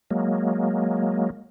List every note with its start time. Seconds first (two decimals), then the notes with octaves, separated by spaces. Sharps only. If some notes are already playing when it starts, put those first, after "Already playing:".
0.11 F#3 G#3 A#3